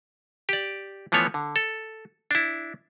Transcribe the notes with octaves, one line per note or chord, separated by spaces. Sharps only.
G4 D5
E3 F3 A3 B3 C#5
D3
A4
D4 E4